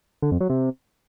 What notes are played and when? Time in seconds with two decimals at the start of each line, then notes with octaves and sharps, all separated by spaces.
0.22 D3
0.31 F2
0.41 F#3
0.50 C3